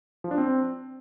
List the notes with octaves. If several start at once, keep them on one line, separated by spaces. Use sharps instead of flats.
F3
D4
C4